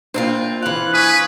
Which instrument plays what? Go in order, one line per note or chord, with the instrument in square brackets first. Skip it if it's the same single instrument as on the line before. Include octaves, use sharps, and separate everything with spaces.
[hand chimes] A#3 D4 C5 [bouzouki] C4 D#4 F4
[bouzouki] E3 F5 [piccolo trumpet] F#6
[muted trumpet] B4 [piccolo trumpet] G#5 [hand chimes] C#6 D#6